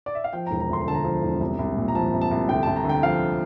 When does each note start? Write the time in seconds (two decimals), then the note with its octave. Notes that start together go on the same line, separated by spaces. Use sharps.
0.06 D5
0.15 E5
0.24 F5
0.33 F3 G5
0.47 E1 A#5
0.60 A#5
0.70 D2 C6
0.81 A#5
0.87 D3 A5
0.95 A#5
1.05 F3
1.23 E1
1.40 C2
1.59 C2
1.77 A#2
1.88 A#5
1.95 F3 A5
2.13 C2
2.21 A5
2.31 C2
2.49 D2 G5
2.63 D2 A5
2.76 A#5
2.85 D3 G5
3.03 F3 F5